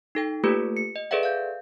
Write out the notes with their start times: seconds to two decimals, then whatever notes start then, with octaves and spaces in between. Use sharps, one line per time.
0.15 D#4 A4 G5
0.44 A3 A#3 F4 G4 A4 B4
0.77 C#7
0.96 D#5
1.11 G#4 A4 B4 D5 E5 F#5
1.23 F5 G6